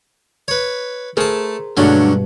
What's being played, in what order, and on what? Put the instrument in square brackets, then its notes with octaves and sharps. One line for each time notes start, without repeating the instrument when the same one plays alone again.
[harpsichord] B4 C#5
[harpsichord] A3 A5 [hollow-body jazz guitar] G#4 A#4 C5
[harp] G2 B2 [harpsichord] D3 F#3 C#4 [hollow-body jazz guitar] G#3 A3 [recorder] D4